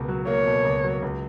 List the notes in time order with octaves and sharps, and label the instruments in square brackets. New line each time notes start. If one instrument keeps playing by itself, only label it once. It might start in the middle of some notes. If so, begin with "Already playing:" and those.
Already playing: [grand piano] C#2 B2 A#3
F#3
[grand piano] A#3 [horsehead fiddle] C#5
[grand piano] B2
C#2
F#3
C#2